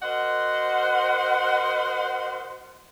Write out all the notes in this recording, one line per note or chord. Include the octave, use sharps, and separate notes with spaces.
F#4 A#4 C5 D#5 F#5